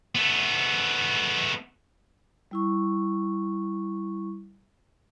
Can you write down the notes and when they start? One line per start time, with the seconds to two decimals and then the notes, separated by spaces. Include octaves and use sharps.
0.15 A3 B3
2.51 G3 E4 C#6